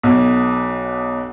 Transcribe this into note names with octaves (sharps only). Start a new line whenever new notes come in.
B1 B2